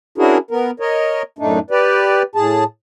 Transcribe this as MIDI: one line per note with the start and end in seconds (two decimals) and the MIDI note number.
0.18 0.38 61
0.18 0.38 62
0.18 0.38 64
0.18 0.38 66
0.18 0.38 68
0.18 0.38 70
0.51 0.71 59
0.51 0.71 70
0.80 1.22 70
0.80 1.22 73
0.80 1.22 75
1.39 1.59 42
1.39 1.59 45
1.39 1.59 57
1.39 1.59 62
1.39 1.59 63
1.71 2.22 67
1.71 2.22 71
1.71 2.22 74
2.35 2.64 45
2.35 2.64 68
2.35 2.64 81